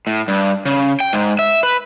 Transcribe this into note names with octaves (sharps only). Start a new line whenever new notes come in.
A2
G2
C#3
G5
G#2
E5
B4